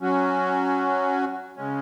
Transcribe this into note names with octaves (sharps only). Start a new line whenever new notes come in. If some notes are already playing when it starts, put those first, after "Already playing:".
F#3 C#4 F#4
C#3 G#3 C#4